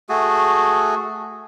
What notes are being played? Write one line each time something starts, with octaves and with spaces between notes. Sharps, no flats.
A3 F#4 G#4